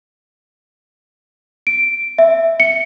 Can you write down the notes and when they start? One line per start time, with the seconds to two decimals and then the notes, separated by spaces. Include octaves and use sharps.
1.67 D7
2.18 E5
2.60 C#7